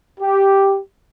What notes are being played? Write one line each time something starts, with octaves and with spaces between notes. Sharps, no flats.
G4